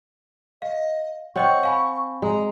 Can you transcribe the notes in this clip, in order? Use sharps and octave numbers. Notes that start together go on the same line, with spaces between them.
D#5 F5
C4 C#5 D#5 F#5 G5 C#6
F5 G#5 B5
G#3 A#5